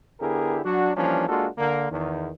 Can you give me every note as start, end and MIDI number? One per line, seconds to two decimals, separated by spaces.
0.21 0.60 50
0.21 0.60 59
0.21 0.60 64
0.21 0.60 67
0.21 0.60 68
0.21 0.60 70
0.64 0.92 54
0.64 0.92 62
0.64 0.92 66
0.97 1.25 52
0.97 1.25 53
0.97 1.25 55
0.97 1.25 58
0.97 1.25 61
0.97 1.25 62
1.28 1.47 56
1.28 1.47 58
1.28 1.47 62
1.28 1.47 65
1.28 1.47 66
1.28 1.47 69
1.58 1.87 50
1.58 1.87 58
1.91 2.30 40
1.91 2.30 51